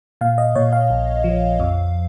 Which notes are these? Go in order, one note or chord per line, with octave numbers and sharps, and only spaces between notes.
A#2 F5
D#5
A#2 C#5
F5
A#1
F3
F2